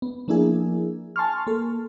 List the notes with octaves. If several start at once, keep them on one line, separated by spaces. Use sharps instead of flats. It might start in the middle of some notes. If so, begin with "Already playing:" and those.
B3
F3 A#3 D4 E4 G#4
G#5 A5 C6 C#6 F6
A#3 A4